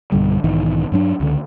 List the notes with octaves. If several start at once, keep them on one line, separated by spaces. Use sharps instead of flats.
B1 G2 D3 G3
B1 G#2 D#3 E3
G2 F#3 D4
C#2 D3